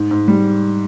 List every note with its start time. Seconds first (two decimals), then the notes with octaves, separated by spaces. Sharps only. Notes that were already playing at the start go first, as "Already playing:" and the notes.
Already playing: G#2
0.11 G#2
0.28 G3